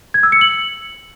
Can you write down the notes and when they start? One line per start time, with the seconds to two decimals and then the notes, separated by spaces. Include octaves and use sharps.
0.14 G#6
0.23 E6
0.32 C#7
0.41 F#7